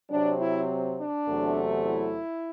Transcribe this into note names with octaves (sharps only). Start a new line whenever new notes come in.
C3 F#3 C4 D4
E4
D4
E2 C3 F#3 A3
E4